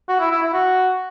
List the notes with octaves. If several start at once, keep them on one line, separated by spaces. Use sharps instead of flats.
F#4
E4
E4
E4
F#4